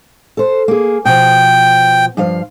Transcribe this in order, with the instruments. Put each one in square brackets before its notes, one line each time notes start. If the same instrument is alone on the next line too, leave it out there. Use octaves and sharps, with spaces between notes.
[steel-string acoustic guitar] A4 C5
A#3 G#4
[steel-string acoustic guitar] B2 F3 [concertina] G5
[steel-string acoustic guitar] G2 F3 F5